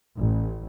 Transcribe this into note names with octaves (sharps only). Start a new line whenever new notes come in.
A1